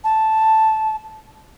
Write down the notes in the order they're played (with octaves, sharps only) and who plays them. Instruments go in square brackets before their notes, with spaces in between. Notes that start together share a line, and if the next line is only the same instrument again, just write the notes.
[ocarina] A5